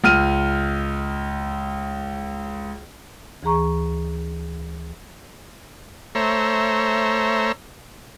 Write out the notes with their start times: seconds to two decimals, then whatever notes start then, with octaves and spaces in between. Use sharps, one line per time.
0.04 C#2 F6 D#7
3.43 D2 E3 G#4 A#5 C#6
6.15 A3 C5 C#5 E5 A#5